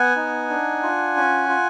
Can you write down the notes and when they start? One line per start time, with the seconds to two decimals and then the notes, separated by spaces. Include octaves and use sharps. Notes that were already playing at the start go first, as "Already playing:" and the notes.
Already playing: B3 F#5 G#5
0.16 D#4
0.49 D4
0.83 F4
1.17 C#4
1.49 F4